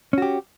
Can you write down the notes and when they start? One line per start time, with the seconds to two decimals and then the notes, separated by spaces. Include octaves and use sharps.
0.13 C#4
0.18 F#4
0.22 G4